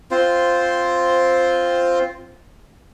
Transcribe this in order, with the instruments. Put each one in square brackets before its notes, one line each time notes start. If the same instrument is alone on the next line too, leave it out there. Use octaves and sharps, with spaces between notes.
[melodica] C4 F4 C5